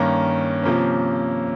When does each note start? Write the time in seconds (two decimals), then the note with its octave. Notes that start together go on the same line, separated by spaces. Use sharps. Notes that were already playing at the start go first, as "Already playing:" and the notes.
Already playing: G2 D#3 A#3 C#4 A#5
0.63 C3 F3 A#3 C#4